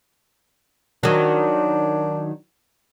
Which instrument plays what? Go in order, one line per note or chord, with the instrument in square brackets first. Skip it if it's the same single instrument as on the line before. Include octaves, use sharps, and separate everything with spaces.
[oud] D#3 F#3 [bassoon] D4